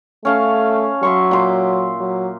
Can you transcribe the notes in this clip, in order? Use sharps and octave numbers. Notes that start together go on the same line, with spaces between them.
A3 C#4 F5 A5
F#3 E5 C6 C#6
A#2 C6 D6
F#3